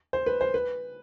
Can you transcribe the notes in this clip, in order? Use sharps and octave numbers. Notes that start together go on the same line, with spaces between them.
C5
B4
C5
B4